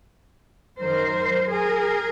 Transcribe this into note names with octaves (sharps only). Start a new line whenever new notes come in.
F#2 D#3 F#3 A#4 C5
G#4 A#4